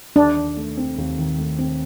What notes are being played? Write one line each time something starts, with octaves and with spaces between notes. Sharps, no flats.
D#2 D4
D#3
A3
C4
D#2
D#3
A3
C4